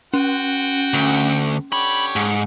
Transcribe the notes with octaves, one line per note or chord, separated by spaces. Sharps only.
C#4 F#4 G5
D2
D3 G4 C#5 B5
G#2